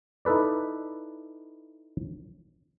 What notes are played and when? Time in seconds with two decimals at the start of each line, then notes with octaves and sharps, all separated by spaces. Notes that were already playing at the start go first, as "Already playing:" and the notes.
0.25 D#4 E4 A4 B4 D5